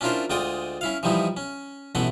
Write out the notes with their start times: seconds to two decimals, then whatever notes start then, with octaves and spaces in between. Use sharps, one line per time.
0.01 C#4 D4 E4 F4 A#4 C5
0.30 D2 G#3 F4 D5 G5 D#6
0.81 C#4 E4 F5
1.03 E3 F3 G3 D#4 E4
1.37 C#4
1.95 A1 B2 E3 A3 E4 F#5